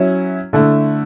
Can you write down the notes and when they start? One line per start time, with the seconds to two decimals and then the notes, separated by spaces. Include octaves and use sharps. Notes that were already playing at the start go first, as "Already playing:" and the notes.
Already playing: F#3 C#4 E4
0.53 D3 A3 E4